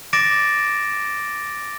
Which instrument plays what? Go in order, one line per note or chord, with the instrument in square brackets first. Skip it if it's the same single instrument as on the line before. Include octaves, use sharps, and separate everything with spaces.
[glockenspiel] D6 A6 A#6 D7 E7